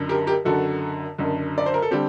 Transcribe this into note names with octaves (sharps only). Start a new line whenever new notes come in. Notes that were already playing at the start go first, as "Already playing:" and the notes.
Already playing: F#1 F#2 D3
G4 A#4
G4 A#4
F#1 F#2 D3 F#4 A4
F#1 F#2 D3
D5
C5
A#4
A4
D3 G3 C4 G4